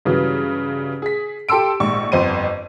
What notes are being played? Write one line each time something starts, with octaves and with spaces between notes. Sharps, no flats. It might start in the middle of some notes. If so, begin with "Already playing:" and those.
G2 C#3 E3 F#3
G#4 B6
G4 A4 C6 E6 D7
A#1 G#2 C#6
G1 F2 C5 D#7